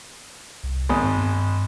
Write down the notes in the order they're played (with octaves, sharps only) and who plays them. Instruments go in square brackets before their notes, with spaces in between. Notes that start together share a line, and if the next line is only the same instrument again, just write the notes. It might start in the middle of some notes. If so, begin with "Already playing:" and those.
[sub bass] C2
[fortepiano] G#1 G#2 D#6
[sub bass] G2